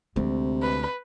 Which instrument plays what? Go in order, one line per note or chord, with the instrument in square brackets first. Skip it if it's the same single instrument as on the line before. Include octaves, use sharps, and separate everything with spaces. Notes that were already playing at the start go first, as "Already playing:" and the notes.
[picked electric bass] D2 [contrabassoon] C3 [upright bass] G#3 C4
[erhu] B4